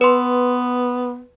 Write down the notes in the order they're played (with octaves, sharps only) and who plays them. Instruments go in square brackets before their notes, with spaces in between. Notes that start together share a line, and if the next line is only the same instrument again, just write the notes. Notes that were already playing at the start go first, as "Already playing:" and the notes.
[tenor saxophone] B3 [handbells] B4 C6